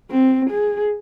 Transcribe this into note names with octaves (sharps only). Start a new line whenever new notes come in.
C4
G#4